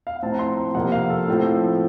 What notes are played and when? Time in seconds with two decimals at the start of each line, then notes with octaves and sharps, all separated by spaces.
0.07 F5
0.16 F#5
0.23 A2 F3 C4 A5
0.32 A#5
0.39 C6
0.57 A#5
0.75 F2 C3 F3 A#3 F#5
0.92 F5
1.10 A4
1.28 A2 F3 C4